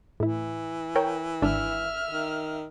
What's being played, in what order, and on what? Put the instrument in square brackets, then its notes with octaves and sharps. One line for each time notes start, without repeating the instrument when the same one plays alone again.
[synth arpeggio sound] A2 E4 [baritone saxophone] E3
[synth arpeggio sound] A#4 C#5 G5
[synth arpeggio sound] G#1 D4 [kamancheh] E5 F6
[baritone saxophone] D#3